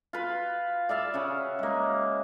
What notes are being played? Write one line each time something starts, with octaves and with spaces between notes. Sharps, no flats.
F4 B4
D5 E5 F5
C#3 C#4 F#5
G#3 A#3